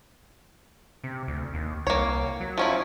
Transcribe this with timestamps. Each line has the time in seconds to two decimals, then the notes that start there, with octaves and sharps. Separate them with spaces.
1.04 C3
1.28 D2
1.54 D#2
1.87 C2 A#3 C#5
2.40 F#3
2.58 F3 C#4 E4